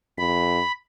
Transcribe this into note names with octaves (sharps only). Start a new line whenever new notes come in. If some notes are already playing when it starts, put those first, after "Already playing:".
F2 B5